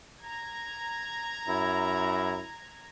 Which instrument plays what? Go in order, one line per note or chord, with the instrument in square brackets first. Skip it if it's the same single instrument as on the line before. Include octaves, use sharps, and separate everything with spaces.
[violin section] A#5 G#6
[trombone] F#2 [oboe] E4